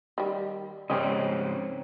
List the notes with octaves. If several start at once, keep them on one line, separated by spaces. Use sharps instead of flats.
D#3 G3
G#2 C#3 G3 C4 C#4 D#4 G4 D#5